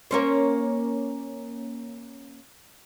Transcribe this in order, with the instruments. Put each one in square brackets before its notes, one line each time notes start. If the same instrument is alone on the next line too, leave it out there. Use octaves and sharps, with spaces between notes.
[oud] A#3 C#4 C5